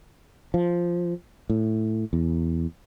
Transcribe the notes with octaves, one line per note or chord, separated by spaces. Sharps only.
F3
A2
E2